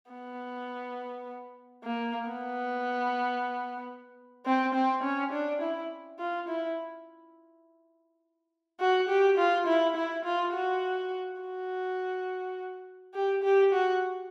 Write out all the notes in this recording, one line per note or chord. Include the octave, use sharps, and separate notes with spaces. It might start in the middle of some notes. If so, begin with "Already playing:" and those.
B3
A#3
B3
C4
C4
C#4
D4
E4
F4
E4
F#4
G4
F4
E4
E4
F4
F#4
F#4
G4
G4
F#4